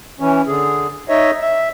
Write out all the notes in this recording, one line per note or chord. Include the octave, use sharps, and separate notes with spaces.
E3 C#4
D3 G#4
D#4 C#5 D#5 E5
E5